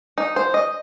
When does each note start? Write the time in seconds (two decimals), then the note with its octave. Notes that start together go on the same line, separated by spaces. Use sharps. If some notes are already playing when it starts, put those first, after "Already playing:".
0.18 D#4
0.36 C5
0.54 D#5